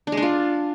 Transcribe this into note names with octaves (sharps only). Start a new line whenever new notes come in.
D4
G#3
D4
F4